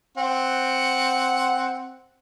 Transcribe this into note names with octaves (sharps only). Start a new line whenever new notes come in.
C4 F#5